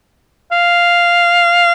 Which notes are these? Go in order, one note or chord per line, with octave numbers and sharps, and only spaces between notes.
F5